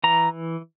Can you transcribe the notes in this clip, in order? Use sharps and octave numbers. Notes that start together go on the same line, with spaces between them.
E3 A#5